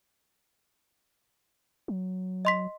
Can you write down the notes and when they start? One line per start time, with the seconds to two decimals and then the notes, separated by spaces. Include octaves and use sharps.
1.88 F#3
2.45 D#5 C6 B6